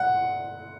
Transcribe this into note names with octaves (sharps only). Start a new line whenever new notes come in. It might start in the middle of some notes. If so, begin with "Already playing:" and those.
Already playing: F#5